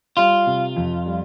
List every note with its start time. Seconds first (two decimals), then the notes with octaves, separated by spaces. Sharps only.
0.17 G3 F4
0.46 C3
0.76 F2
1.06 G3